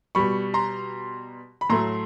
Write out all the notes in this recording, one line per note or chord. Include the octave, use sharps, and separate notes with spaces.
B2 G3 B5 C#6
A#5 C6
B5
A2 F#3 A3 A#5 C6